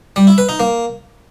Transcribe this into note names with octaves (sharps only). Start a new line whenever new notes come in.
G3
E4
B4
D#4
A#3